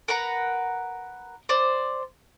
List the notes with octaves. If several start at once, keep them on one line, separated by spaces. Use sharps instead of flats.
A#4 B4 F#5 A#5
C5 D5